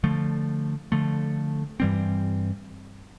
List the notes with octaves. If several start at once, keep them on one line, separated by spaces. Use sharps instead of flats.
D3 F3 A3
D3 F3 A3
G2 E3 G3 C4